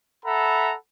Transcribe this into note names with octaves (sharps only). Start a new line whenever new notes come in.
A4 E5 F#5 A#5 B5